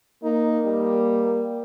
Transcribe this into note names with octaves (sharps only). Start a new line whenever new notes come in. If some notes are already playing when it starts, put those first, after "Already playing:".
A#3 D#4
G3